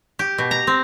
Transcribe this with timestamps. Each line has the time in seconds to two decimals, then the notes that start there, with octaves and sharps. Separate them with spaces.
0.19 G4
0.38 B2
0.51 A#5
0.67 C4